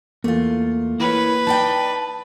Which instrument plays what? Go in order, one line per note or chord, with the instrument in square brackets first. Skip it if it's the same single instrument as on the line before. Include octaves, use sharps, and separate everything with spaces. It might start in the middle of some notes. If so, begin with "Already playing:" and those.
[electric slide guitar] E2 [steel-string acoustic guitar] A3 F4 [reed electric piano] A#3
[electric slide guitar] E4 A#4 C#5 [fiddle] B4
[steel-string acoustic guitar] D#4 D5 G5 [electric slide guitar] A5